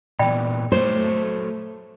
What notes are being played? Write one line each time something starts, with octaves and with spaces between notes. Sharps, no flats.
A#2 E3 B3 D5 G5 B5
F#3 A3 A4 C5 C#5